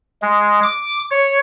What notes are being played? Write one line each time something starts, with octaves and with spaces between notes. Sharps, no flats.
G#3
D6
C#5